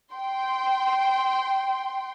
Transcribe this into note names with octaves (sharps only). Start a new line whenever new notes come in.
G5 C6